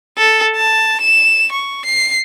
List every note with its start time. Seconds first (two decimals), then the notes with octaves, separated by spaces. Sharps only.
0.18 A4
0.56 A5
1.01 E7
1.52 C#6
1.85 C7